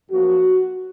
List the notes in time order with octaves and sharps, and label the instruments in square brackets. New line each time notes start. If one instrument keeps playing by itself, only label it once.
[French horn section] F#2 F3 A#3 F#4